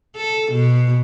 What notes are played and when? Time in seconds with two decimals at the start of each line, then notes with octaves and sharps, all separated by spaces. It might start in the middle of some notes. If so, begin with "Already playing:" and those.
0.16 A4
0.52 B2